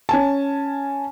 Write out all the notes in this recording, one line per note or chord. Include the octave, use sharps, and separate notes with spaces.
C#4 G#5 A5